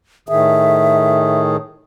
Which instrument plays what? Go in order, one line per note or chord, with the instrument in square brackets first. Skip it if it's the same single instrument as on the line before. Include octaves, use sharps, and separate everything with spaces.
[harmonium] A2 D#3 G#4 [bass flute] E5